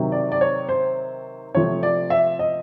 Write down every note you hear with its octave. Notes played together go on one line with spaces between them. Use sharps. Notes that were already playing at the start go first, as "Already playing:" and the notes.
Already playing: C3 D#3 F#3
D5
D5
C#5
C5
C3 F3 A3 C#5
D5
E5
D#5